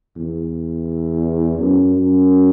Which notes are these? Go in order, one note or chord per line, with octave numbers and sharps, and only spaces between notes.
E2
F#2
F#2